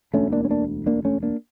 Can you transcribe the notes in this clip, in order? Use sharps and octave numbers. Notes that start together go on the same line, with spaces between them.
E1 D2 D3 A3 C#4
A#3 D4
C#4
A#3 D4
A#3 D4
A3 C#4
A#3 D4